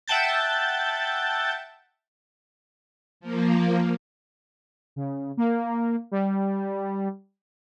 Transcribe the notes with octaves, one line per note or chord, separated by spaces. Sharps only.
E5 F#5 G5 A5 G6 A6
F3 A#3
C#3
A#3
G3